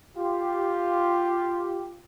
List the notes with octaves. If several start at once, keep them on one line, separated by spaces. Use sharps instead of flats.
F4 G4